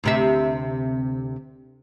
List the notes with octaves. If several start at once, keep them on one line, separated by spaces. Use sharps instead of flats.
D2 C3 E5